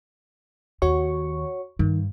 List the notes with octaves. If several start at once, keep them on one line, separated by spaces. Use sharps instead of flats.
D#2 F#4 C#5 C#6
G2 D#3